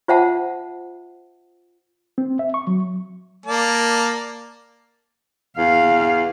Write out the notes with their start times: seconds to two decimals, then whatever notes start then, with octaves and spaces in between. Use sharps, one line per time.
0.08 F4 C5 E5 F#5 A5
2.18 C4
2.39 E5
2.54 C#6
2.67 F#3
3.46 A#3 D5 A5
5.58 E2 F5